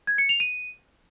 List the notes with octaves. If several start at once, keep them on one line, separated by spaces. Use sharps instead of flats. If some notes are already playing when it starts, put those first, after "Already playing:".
G#6
C#7
F7
D#7